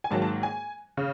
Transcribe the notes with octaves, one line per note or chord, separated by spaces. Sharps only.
G#5
G#2 D#3 F#3 A#3 A5
A5
G#5
C#3